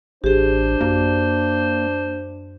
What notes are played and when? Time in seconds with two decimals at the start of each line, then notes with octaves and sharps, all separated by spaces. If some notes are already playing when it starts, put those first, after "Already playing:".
0.24 A1 D4 G4 G#4 C5
0.81 F#2 A#3